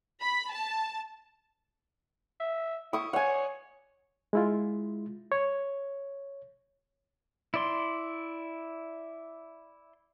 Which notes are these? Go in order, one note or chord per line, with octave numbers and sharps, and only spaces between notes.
B5
A5
E5
E4 C#6 D#6
C#5 F#5 G#5
G#3 E4 F4
C#5
E4 D5 C6